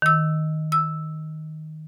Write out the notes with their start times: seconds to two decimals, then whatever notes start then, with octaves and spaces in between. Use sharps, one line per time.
0.02 D#3 E6
0.72 E6